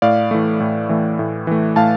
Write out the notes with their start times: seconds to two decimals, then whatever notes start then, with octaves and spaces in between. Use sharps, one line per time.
0.02 A2 D5 F5
0.31 E3 A3
0.60 A2
0.89 E3 A3
1.19 A2
1.47 E3 A3
1.76 A2 F5 A5